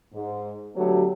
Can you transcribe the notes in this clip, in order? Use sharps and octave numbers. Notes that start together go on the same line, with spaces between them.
G#2
D3 F#3 A3 B3 G4